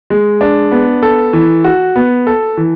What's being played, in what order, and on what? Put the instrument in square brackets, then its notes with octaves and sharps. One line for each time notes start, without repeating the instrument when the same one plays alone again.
[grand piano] G#3
D4
B3
A4
E3
F#4
B3
A4
E3